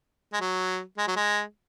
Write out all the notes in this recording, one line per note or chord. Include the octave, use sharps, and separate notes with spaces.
G#3
F#3
G#3
F#3
G#3